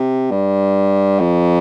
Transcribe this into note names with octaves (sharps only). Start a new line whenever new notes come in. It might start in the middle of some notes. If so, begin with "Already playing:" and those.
Already playing: C3
G2
F2